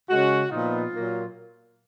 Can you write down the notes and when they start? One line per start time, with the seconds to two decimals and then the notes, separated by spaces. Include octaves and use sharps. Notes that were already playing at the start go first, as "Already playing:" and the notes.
0.10 C#3 G#3 C#4 F#4
0.52 A#2 F3 B3 D#4 F4
0.93 A#2 F#3 A#3